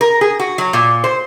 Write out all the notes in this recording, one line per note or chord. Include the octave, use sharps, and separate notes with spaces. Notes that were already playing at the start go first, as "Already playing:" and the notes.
A#4
G#4
F#4
F#3
A#2
C5